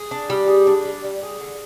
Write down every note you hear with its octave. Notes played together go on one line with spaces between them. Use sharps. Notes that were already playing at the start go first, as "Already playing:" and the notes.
Already playing: G#4
D4
G3
G#4
D4
G3
G3
G#4
D3